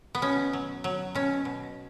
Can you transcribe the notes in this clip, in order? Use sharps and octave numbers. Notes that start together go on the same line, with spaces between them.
B3
B2 C#4
F#3
F#3
B2 C#4
B2